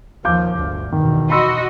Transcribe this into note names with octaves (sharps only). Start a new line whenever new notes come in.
D#2 F3 F5 D6 G6
G1 D2
E2 B2 D#3
F#4 D#5 B5 C6 E6